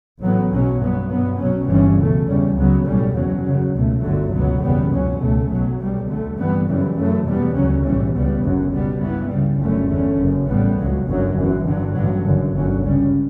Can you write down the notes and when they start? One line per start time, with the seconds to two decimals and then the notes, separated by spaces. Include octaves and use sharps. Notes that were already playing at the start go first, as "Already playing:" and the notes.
0.22 A1 A2 F#3 B3
0.50 B1 B2 F#3 C#4
0.79 G2 F#3 B3
1.09 G2 F#3 B3
1.39 B1 B2 F#3 C#4
1.68 G1 G2 E3 G3 C#4
1.97 C#2 B2 A3
2.27 E2 C#3 G3 C#4
2.55 C#2 C#3 F#3 B3
2.85 B1 A2 G3 C#4
3.14 F#1 E2 C#3 F#3
3.43 F#2 C#3 F#3
3.73 C#2 B2 A3
4.02 G1 F#2 D3 F#3 A3
4.32 C#2 B2 F#3 B3
4.62 F#1 E2 B2 G3 B3
4.90 C#2 B2 F#3 C#4
5.19 C#2 B2 A3
5.50 B1 B2 F#3
5.78 B1 B2 G3
6.07 D2 D3 A3
6.37 G2 E3 G3 B3
6.66 F#2 C#3 E3 G3
6.96 F#2 C#3 E3 A3
7.25 E2 B2 G3 B3
7.55 D2 C#3 F#3 C#4
7.84 B1 A2 E3 G3 C#4
8.13 C#2 C#3 G3 B3
8.43 G1 F#2 C#3 F#3
8.72 C#2 B2 G3 B3
9.01 G2 E3 B3
9.30 C#2 C#3 G3
9.60 G1 F#2 D3 A3 C#4
9.89 E2 D3 A3 C#4
10.18 F#1 F#2 C#3
10.48 A1 A2 G3 B3
10.77 C#2 C#3 F#3
11.06 G1 F#2 D3 F#3
11.36 G1 F#2 E3
11.65 G2 D3 F#3
11.94 A1 G2 D3 F#3
12.24 F#1 F#2 D3
12.54 G1 F#2 D3 F#3 C#4
12.83 C#2 C#3 G3 C#4